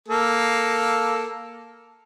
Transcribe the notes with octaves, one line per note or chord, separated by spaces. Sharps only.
A#3 A4